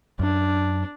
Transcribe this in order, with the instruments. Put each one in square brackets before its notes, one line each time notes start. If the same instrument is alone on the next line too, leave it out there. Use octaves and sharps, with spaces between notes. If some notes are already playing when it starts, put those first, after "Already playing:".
[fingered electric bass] F#2 [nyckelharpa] D4